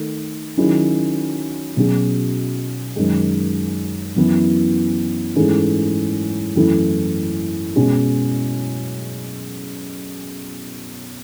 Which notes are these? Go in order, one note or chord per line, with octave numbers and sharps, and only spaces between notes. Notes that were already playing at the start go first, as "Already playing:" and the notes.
Already playing: D#3 A3
D#3 F#3 C#4 E4 G#4
B2 F#3 C#4 G#4
F#2 D#3 G#3
F#2 E3 B3 E4
G#2 E3 A3 C#4 G#4
F#2 E3 A3 C#4 E4
B2 G#3 C#4 G#4